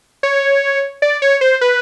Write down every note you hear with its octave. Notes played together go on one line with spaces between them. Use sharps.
C#5
D5
C#5
C5
B4